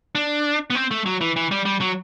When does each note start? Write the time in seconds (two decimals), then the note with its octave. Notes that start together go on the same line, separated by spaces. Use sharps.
0.15 D4
0.70 B3
0.75 C4
0.91 A3
1.06 F#3
1.21 E3
1.36 E3
1.51 G3
1.65 G3
1.81 F#3